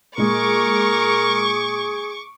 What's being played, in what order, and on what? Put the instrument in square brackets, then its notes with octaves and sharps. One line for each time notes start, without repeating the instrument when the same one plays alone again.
[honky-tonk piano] A#2 G#3 [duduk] G#4 [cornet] A#4 [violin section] C#6 D6